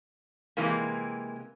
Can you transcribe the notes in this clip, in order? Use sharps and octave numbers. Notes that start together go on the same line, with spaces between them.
C3 E3 G#3 A#3